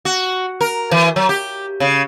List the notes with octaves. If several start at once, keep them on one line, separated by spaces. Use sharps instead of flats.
F#4
A#4
E3
F#3
G4
C#3